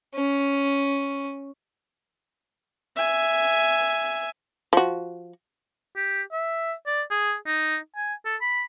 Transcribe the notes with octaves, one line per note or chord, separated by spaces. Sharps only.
C#4
E5 G#5
F3 F#4
G4
E5
D5
G#4
D#4
G#5
A4
B5